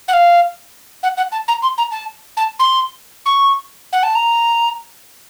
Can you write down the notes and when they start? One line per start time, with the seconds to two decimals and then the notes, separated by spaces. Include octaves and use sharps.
0.08 F#5
0.13 F5
1.03 F#5
1.17 F#5
1.32 A5
1.48 A#5
1.62 C6
1.77 A#5
1.91 A5
2.37 A5
2.59 C6
3.25 C#6
3.92 F#5
4.03 A5
4.15 A#5